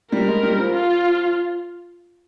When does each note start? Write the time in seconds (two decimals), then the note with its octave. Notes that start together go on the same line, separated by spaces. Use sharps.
0.12 G3 A#4
0.28 G#3
0.43 G3
0.58 F3
0.74 F4